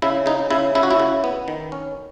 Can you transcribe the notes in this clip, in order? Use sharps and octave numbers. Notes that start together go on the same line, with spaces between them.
C#3 E4
C#3 D#4
C#3 E4
C#3 E4
F#4
E4
C#3
B3
D#3
C#4